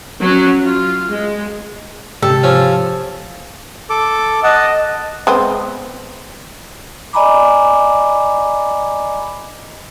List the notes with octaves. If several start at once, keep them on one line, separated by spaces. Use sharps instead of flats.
F#3 C#4
F4
G#3
G#2 C3 G4 A4
F3 C#4
A4 D6
D#5 F#5 A5
G#3 B3 C4
D5 D#5 G#5 A#5 B5 D6